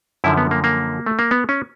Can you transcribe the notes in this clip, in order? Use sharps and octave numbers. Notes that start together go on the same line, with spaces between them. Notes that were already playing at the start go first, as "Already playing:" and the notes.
F#2 D3 F3 E4
B3
A#3
A#3
A3
A#3
B3
C#4